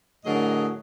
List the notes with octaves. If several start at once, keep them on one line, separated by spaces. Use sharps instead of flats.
A2 D3 F#3 G#4 A#4 D#5